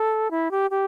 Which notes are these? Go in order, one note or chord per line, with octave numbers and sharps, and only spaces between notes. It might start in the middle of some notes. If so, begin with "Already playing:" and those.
Already playing: A4
E4
G4
G4